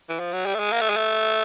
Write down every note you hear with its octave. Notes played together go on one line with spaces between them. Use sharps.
E3
F3
F#3
G3
A3
G#3
A#3
A3
G#3
A3